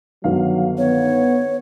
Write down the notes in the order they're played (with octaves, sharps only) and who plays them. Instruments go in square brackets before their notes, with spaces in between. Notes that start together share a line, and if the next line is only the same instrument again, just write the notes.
[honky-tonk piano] G1 D#3 F5 [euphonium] F#3
[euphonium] B3 [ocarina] C#5